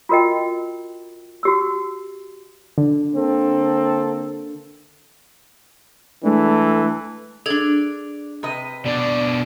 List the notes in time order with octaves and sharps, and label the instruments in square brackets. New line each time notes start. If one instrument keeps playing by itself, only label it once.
[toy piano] F4 F#4 A#4 D#5 G5
F#4 G4 E6
[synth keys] D3
[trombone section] A#3 C4 A4
[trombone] E3 [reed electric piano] G#3 A3 D4 [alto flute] A4
[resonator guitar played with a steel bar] D4 D5 [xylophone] G#4 A4 G#6
[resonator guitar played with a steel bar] C3 B4 D#5
[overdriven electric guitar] B2 D4 [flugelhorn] D5